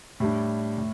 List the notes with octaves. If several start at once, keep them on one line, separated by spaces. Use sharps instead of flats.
A2 G3 D4
A2